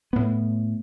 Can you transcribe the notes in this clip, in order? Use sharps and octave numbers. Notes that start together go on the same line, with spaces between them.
A2 B3